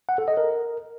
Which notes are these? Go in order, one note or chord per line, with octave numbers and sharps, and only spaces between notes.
F#5
A4
D#5
A#4